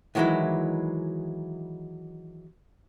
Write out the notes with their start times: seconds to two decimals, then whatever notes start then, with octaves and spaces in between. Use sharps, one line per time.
0.15 D#3 E3 F#3 G#3 E4